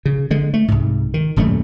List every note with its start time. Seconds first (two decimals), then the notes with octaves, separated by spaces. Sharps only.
0.05 C#3
0.31 D3 G#3
0.54 A3
0.68 C2 G#2
1.14 D#3
1.36 D#1 F#2 G3 A3